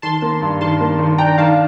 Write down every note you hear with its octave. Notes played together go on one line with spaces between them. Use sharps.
D#3 A5 C6
A#3
G2
D#3 A5 C6
A#3
D#3
D4 G5 A#5
D#3 F5 A5